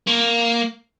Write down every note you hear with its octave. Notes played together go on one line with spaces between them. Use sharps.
A#3